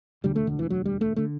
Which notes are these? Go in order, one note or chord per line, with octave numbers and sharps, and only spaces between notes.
E1 D2 D3 G3
A3
D3
E3
F#3
G3
A3
D3 A3